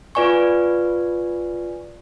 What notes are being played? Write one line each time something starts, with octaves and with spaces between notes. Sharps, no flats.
F4 B4 D5 G#5 C#6